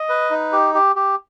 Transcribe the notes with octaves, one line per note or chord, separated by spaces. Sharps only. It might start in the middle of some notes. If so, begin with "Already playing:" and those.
Already playing: D#5
B4
D#4
G4
G4
G4